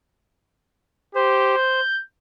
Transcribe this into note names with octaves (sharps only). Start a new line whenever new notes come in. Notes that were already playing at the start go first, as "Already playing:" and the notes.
G4 C5
G6